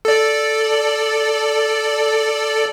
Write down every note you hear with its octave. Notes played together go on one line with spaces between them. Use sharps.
A4 D5